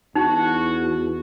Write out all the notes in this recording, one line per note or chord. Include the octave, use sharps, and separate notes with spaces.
E2 D#4 F#4